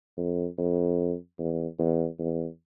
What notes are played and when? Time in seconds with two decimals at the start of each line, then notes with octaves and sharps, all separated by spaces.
0.18 F2
0.58 F2
1.38 E2
1.79 E2
2.19 E2